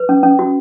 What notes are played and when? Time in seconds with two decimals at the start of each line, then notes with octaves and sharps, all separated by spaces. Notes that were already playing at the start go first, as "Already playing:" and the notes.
Already playing: B4
0.09 C#4
0.23 C#4
0.39 F#4